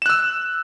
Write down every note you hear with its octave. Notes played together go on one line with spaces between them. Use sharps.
E6 F#6 E7